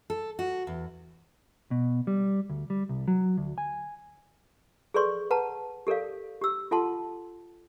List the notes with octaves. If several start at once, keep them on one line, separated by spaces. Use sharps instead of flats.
A4
F#4
E2
B2
G3
D2
G3
C2
F#3
D2
G#5
G#4 A4 B4 D5 C6 C#6
B4 F#5 A5 A#5
G4 A4 A#4 D5 F5
G4 E6
F4 A4 F#5 A5 C6